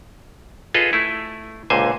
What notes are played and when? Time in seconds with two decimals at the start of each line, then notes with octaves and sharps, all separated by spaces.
0.74 F4 G#4 A4 B4 D#5
0.93 A3 E4
1.70 C#2 A#2 D3 C5 G#5